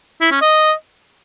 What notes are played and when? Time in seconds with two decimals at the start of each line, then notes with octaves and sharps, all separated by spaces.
0.21 E4
0.31 C#4
0.41 D#5